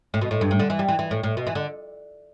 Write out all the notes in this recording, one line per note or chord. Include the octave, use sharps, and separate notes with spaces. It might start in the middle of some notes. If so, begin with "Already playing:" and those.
A2
B2
A2
G2
A2
D3
E3
G3
E3
E3
A2
A2
B2
E3
D3